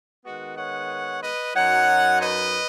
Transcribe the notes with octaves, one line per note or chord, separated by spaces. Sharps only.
D#3 G#3 B3 F#4
C#5 F#5
B4 D#5
F#2 F#3 D#4 C#5 F#5
B4 D#5